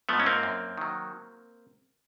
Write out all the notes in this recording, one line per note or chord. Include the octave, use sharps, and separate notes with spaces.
G#2 F3 A3 B3
C#4
A#3 C4
F#2
D#3 F#3